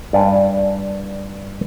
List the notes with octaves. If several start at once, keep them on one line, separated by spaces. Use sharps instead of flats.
G2 D5 G#5